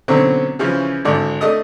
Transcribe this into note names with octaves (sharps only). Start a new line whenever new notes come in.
B2 D3 F#3 C4 C#4
C#3 E3 F3 C#4
G#1 D3 D5
A3 D4 D#5 D#6